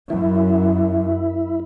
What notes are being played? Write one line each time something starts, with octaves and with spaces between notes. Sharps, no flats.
F#2 E4